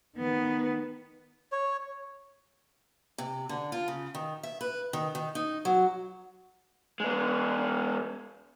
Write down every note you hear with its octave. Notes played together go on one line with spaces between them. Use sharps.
D#3 B3
C#5
C3
D3
F4
C#3
D#3
E5
B4
D#3
D#3
D#4
F#3
G#3 B3